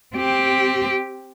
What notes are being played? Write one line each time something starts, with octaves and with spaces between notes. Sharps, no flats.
C4 G4